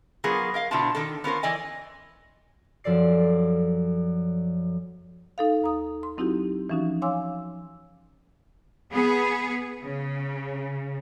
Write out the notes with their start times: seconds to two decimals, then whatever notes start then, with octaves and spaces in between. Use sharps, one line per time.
0.24 F#3 B3 F4 G#4 A#4
0.54 A#4 D#5 F5
0.71 B2 D3 D4 E4 F4 A5
0.95 D3 D#3 A#3 A4
1.24 B3 C#4 F4 A#4 C5
1.43 E3 D5 D#5 G#5
2.84 F#2 F3 A4 D5 C7
5.38 D#4 A4 F5
5.62 D#2 A#5 D#6
6.03 C6
6.17 F#3 C4 D#4 E4 F#4 G4
6.70 E3 F3 C#4 D#4 F#4
7.02 C#5 F5 G#5 C6 D6 E6
8.92 B3 G#4
9.83 C#3